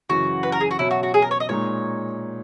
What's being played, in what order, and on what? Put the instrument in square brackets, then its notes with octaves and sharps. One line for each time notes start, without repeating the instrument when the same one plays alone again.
[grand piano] F#2 C#3 E3 [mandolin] F#4
[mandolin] B4
A#4
G#4
F#4
[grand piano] B2 F#3 C#4 [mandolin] E4
[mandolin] F#4
F#4
G#4
A#4
C#5
D#5
[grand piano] A#2 G#3 D#4 [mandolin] C#5